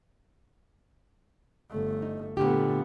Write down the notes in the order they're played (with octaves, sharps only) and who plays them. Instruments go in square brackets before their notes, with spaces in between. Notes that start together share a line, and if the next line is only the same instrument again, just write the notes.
[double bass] G1 A3
[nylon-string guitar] D#4
[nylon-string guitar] A#2 D3 G4 [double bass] A3 B3